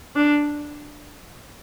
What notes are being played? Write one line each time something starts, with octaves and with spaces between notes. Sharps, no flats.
D4